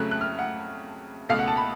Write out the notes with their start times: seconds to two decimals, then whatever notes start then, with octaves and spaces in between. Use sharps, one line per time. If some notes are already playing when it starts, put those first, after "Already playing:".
Already playing: F2 C#3 F#3 A3 F#6
0.11 F#6
0.21 F6
0.39 F#5
1.29 C#2 B2 A3 F5
1.39 F#5
1.48 A5
1.57 B5